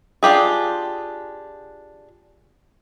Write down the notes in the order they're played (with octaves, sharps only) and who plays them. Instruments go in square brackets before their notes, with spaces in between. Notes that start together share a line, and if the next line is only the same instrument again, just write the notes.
[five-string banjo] D4 F4 G4 G#4